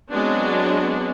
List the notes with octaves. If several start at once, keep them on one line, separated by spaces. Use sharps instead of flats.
F#3 G#3 B3 C4 D4